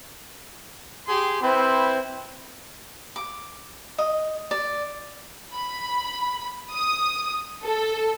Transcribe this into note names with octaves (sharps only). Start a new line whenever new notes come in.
G4 G#4 C6
C4 E4 B4 C5
D6
D#5
D5
B5
D#6
A4